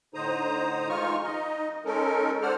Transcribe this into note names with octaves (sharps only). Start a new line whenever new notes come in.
A2 D3 D#4 C5 A#5 D#6
E3 G#3 D#4 F4 C#6 F6
D#4 D#5
G#3 C#4 D#4 A4 A#4
G#3 A4 C5 D5 F#5 F6